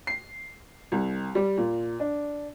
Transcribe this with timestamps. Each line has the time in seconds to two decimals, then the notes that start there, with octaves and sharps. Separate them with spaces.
0.07 C7
0.92 C2
1.35 G3
1.58 A#2
2.00 D4